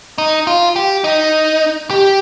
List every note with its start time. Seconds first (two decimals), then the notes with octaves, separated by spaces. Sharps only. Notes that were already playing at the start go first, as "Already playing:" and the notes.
0.18 D#4
0.47 F4
0.76 G4
1.04 D#4
1.90 G4